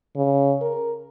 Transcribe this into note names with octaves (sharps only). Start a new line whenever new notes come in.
C#3
A#4